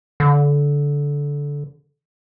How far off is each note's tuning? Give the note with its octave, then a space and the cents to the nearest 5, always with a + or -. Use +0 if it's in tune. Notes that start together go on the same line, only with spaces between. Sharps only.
D3 -20